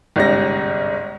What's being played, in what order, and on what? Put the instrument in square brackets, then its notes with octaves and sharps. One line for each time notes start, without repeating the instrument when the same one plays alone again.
[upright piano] G1 C2 G#2 C#4 G4 A#6